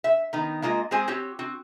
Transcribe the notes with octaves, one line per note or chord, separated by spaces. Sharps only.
E5
D#3 B3 D#4
G#3 A#3 F4 D#5
G#3 C4 F#4 G#4 C5 G#5
C4 F#4 G4 C#5
C4 F#4